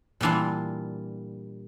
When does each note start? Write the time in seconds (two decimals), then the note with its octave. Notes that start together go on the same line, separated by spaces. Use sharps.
0.21 A#2 E3 G3 D4 F4